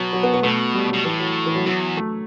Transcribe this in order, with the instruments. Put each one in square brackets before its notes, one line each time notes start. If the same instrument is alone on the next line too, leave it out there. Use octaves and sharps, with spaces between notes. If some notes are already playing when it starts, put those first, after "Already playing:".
Already playing: [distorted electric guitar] B2 [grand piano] F#3
[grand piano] F#3
B3
B3
[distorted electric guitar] B2 [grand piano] A3
[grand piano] G3
[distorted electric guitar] B2 [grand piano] F#3
[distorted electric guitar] A2 [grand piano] E3
[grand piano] F#3
E3
F#3
[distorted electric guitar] E2 [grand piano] F#3
[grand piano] A3